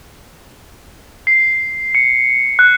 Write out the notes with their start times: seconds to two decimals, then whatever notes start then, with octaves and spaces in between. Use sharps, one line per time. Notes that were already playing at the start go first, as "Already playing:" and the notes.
1.27 C7
1.95 C#7
2.59 F#6